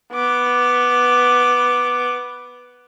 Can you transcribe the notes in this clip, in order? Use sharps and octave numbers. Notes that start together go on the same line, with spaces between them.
B3 D6